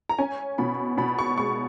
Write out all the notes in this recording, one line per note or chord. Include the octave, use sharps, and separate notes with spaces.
A#5
C#4 G#5
B2 B5
B2 B5
C#6
G#3 C#6